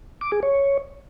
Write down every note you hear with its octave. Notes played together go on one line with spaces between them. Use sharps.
D6
G#4
C#5